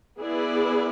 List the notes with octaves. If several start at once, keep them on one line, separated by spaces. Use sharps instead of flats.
B3 E4 G#4 B4 D5